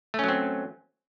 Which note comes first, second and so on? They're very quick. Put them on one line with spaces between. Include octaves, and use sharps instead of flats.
A3 C#4 F#3 C4